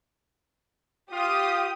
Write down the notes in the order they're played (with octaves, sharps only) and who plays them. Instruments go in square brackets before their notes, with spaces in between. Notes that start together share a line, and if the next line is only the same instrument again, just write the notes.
[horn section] F4 [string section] G4 D#6